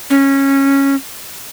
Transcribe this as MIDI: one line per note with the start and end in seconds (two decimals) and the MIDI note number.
0.10 0.95 61